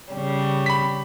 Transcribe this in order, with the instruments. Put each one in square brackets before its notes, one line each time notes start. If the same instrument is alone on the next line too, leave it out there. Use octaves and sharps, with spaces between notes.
[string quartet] C#3 G3
[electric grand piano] B5 B6